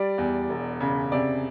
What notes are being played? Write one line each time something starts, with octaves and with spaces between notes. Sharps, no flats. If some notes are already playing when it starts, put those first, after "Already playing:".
Already playing: G3 D5
E2
E1
C#3
C3 D5